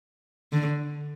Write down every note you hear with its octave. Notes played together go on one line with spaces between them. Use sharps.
D3